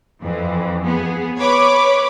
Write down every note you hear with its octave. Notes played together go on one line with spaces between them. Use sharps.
F2 E3
B3 G#4
B4 C#5 B5 D6